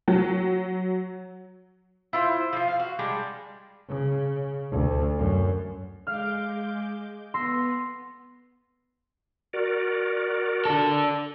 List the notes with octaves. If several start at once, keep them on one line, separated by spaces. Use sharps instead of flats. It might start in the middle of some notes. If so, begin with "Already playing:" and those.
F#3
E4 F4 C5
F3 F4
F5
F#4
G3 G#3 D4
C#3
D2
F#2
G#3 F5 D6 F6 G6
B3 C6 E6 A#6
F#4 A#4 D5
D4 A4